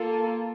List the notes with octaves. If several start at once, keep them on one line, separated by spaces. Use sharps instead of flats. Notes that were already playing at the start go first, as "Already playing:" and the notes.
Already playing: A#3 F4 A4